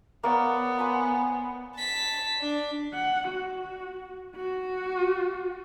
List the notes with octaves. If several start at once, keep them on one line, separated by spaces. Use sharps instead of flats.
A#3 B3 C#5 D5
C5 G#5 B5
A5 B6
D4
F#5
F#4
F#4